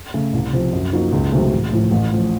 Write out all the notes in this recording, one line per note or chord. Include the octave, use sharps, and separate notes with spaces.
C#3 A3
C2
C3 F3
F#2
F3 A#3 D#4 F#4
C#2
C3 D#3 F#3 A3
A1
A2 F3
A1
A2 F3